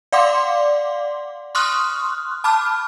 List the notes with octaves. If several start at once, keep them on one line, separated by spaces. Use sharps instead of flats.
D5 F5 F#5 C6 D6
C6 C#6 D#6 F6 F#6
A5 B5 D6 F6